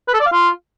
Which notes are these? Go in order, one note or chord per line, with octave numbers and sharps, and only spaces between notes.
B4
A4
D5
F5
F4